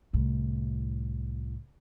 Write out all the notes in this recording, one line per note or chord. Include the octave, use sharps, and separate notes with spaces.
C2 A2